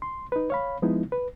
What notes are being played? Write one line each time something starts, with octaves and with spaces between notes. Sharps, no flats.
C6
D#4 B4
C#5 F5 B5
F3 G#3 B3 D#4 E4
B4